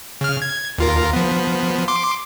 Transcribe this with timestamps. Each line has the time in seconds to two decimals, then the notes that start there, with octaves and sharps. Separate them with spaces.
0.21 C#3 F6
0.42 G#6
0.78 D#2 F4 A#4
1.13 F3 B3
1.88 C6 D6